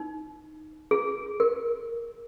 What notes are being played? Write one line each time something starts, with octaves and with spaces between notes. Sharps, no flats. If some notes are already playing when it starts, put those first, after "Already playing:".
Already playing: D#4
G#4
A#4